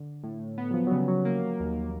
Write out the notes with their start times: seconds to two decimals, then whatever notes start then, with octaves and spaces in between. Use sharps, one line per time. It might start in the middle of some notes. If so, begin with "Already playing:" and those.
Already playing: D3
0.23 A2
0.58 B3
0.71 F#3
0.74 F3
0.87 F#3
0.91 C#3 G3
1.08 F#3
1.25 A#3
1.60 D#2